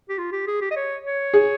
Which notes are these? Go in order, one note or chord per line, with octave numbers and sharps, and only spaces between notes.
G4
F4
G4
G#4
G4
D#5
C#5
C#5
G#4